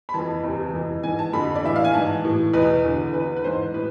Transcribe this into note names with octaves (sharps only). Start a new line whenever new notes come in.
B5
F2 E3 A5
E2 C3 E3
F2 E3
G#2 E3 G#5
A5
F2 D3 B5
D5
A2 E3 E5
F5
G#5
G#2 E3 A5
A2 E3
E2 B2 B4
E2 D3
E2 D3 B4
B4
G#2 E3 C5
A2 B4